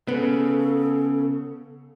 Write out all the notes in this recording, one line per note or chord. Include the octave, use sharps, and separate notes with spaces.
C#3 B3 A4